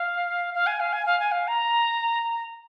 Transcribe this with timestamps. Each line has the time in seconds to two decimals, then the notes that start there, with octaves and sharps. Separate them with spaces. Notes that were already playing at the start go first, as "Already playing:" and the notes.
Already playing: F5
0.54 F5
0.67 G#5
0.80 F5
0.93 G#5
1.06 F5
1.20 G#5
1.32 F5
1.48 A#5